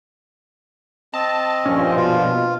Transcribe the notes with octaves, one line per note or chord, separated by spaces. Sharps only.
C4 D#5 A5
G2 A#2 F3 C#4
B2 F4